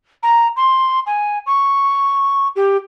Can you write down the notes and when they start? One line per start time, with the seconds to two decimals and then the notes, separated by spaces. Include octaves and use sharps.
0.23 A#5
0.57 C6
1.06 G#5
1.46 C#6
2.56 G4